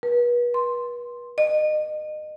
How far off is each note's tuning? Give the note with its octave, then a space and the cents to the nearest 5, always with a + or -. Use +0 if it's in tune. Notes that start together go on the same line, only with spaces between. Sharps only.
B4 -35
C6 +5
D#5 -30